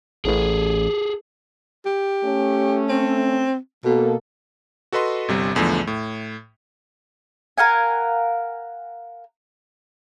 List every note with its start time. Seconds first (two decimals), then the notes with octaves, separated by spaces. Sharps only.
0.25 A1 G#4 A4
1.86 G4
2.24 A3 C#4
2.89 C4
3.85 B2 A#3 A4
4.92 F#4 A4 B4 D#5 C6
5.28 G1 C3 G3
5.55 B1 E2 D3 F3 A3
5.87 A2
7.58 A#4 F5 F#5 G#5